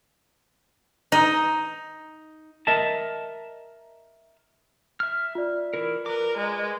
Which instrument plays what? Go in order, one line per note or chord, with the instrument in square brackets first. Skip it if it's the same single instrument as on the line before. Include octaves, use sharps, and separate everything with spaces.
[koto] D#4
[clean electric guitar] A#4 D#5 E5 A5
[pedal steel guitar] E5 F6
[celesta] F4 D5
[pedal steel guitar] E3 E4 A#4
[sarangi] A#4 [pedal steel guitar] B4 D6
[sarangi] G#3